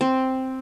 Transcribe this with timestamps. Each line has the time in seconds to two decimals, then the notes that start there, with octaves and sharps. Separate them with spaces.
0.01 C4